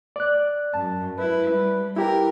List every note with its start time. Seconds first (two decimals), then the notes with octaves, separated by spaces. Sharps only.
0.16 D5 F#6
0.74 F#2 A5
1.18 E4 B4
1.51 G3
1.96 E4 G4 A#4 G5